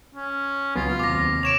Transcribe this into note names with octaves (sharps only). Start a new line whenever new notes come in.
C#4
C#2 F#3 B3 F4
D#2 C3 D6 A#6
C#5 D7 E7 F7